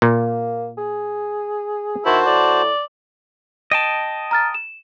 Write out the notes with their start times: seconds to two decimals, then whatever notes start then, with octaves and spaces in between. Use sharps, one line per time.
0.02 A#2 A#3
0.78 G#4
2.06 D#3 E4 F#4 C5 A5
2.26 A2 D5
3.71 D#5 G5 A5
4.31 A#5 F6 A6
4.54 E7